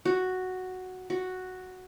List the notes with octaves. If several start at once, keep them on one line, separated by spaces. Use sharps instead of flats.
F#4
F#4